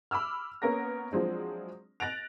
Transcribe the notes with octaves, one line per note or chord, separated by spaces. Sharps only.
B5 D6 E6 F6
A#3 B3 C#4 A#4 B4 A#6
F3 F#3 G#3 C4 D4
F#6 A6 A#6 D7 F7